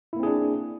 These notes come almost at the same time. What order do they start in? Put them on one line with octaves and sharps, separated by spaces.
E4 A#3 C4 G#4 D4